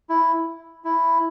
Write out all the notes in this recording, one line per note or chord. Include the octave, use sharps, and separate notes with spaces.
E4
E4